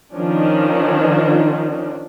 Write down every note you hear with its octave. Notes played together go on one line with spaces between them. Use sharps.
D#3 F3 C#4 D4